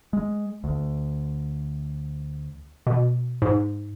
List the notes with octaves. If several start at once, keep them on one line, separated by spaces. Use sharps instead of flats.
G#3
D2
B2
G#2